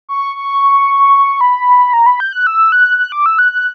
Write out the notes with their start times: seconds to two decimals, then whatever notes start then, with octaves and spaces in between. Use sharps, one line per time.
0.09 C#6
0.36 C#6
1.41 B5
1.93 A#5
2.06 B5
2.20 G6
2.33 F#6
2.47 E6
2.72 F#6
2.99 F#6
3.12 D6
3.26 E6
3.39 F#6
3.52 F#6